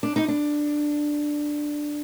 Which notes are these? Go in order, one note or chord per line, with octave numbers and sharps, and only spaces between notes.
D4
D#4
D4